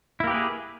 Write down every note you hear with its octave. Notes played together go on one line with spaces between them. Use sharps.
A#3 E4 G4 G#4 B4